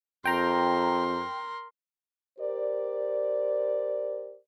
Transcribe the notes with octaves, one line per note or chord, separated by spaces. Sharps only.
F2 A#4 G5 A#5 C6
G4 A#4 C5 D5